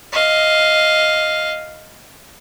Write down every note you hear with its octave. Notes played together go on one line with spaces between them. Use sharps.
D#5 F5